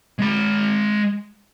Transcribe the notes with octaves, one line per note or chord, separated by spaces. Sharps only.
G#3 B5